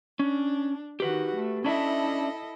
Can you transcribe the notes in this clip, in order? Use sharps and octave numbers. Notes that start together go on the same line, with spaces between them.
C#4 D4
D#3 F#4 G4 B4
A3
C#4 D4 E4 A4 D#5 E5